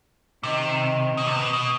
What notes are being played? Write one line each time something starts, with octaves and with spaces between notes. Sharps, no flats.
C3 D#3
B2
C3
B2
B2